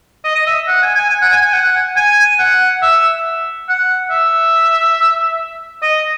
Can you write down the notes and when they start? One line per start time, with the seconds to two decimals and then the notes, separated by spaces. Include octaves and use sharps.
0.24 D#5
0.36 D#5
0.47 E5
0.68 F#5
0.82 G#5
0.96 G#5
1.10 G#5
1.22 F#5
1.32 G#5
1.42 G#5
1.53 F#5
1.97 G#5
2.39 F#5
2.82 E5
3.69 F#5
4.11 E5
5.82 D#5